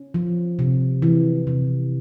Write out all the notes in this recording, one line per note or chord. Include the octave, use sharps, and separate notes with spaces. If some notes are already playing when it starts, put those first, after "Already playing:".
Already playing: C#4
F3
C3
E3
C3